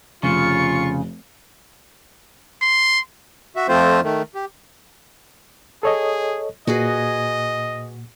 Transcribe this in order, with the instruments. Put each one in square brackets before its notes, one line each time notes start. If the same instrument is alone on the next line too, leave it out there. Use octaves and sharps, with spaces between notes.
[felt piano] F1 [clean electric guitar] C#3 [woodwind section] F4 [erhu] C#6
[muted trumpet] C6
[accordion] F#4 E5
F2 F3 A3 C4 F4 C5
D#3 A3
G4
[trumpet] G#4 [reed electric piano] A4 C#5 D#5
[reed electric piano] A#2 [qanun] F#4 G#4 B4 [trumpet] D#5